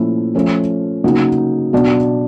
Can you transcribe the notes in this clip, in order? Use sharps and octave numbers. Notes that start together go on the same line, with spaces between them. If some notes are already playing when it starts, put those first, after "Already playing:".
Already playing: A#2 F3 A3 C#4 E4
F3 A3 C#4
C#3 F#3 A#3 D#4
B2 F#3 B3 D4